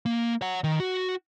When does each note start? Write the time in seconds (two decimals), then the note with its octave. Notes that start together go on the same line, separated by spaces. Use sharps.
0.06 A#3
0.41 C#5 F#5
0.64 D#3
0.80 F#4